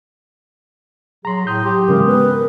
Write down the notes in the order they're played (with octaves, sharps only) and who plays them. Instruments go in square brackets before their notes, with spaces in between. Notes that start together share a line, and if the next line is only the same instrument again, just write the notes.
[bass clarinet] F#3 [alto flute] G#4 [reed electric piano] A#5 C6
[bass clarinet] A2 [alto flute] C6 [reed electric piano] D#6 G6
[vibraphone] F#3 [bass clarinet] G4
[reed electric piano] G#2 C#3 E3 [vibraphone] G#3 D#6 [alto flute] A#4
[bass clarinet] C#3 [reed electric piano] B3 [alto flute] B4
[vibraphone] A#4